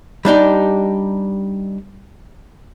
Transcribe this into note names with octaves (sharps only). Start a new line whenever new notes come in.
G3 D4 D#4 G4